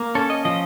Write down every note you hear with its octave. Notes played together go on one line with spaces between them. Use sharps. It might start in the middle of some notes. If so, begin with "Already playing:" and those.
Already playing: A#3
C#4 A4
D#5
F3 D#5